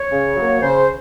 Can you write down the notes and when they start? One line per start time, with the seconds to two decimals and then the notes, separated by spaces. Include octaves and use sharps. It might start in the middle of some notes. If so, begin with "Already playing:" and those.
Already playing: C#5
0.10 C#3
0.36 F#3 A#3
0.61 C#3 C5